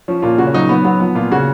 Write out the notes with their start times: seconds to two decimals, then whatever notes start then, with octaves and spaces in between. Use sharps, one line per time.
0.08 F3 C#4
0.22 A#2 F4
0.38 C#3 F#4
0.47 C#4
0.54 F#3 D#4
0.69 F#3 B3
0.85 F#3 B3
1.00 F3 B3
1.15 A#2 F4
1.31 C#3 F#4